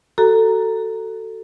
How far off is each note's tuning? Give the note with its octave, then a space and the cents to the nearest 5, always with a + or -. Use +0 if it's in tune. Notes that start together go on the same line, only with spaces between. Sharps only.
F#4 +20 A4 +15 A#5 +0